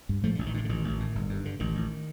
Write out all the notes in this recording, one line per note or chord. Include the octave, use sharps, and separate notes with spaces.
G2
A2 F3 A3
A1 D3
D#3
A2 D3
D3
A1 D#3
A1
A2
G1
G2
D3
A1 D#3
A1